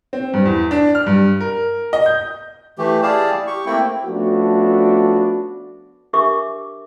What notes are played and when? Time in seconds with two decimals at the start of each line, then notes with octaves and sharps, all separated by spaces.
0.13 C4
0.33 G2
0.45 E2
0.71 D4
0.95 F6
1.06 G2
1.40 A#4
1.93 D#5
2.06 G6
2.78 E3 A3 G4
3.03 E4 G4 G#4 D5 F5 A5
3.47 G4 C#6
3.66 A3 A#3 C4 E4 G5
4.05 F3 A3 B3 C#4 D4 F#4
6.13 D4 G4 A#4 E5 C#6 D6